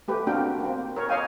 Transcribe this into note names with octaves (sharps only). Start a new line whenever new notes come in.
A3 G4 B4
A#3 C4 D4 F#4 A#4 G5
A#3 C4
A#4 C#5
C#5 D#5 F5 G5 G#5